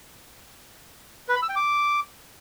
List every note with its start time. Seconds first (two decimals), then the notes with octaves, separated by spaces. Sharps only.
1.29 B4
1.36 B5
1.42 E6
1.49 G5
1.56 D6